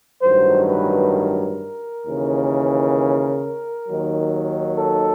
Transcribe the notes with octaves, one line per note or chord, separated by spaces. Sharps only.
A1 G2 D#3 F#3 C5
B4
A#4
D#2 C#3 E3
D#2 D#3 F#3
A4